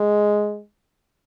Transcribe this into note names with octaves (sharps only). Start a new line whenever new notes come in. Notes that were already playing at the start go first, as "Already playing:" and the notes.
Already playing: G#3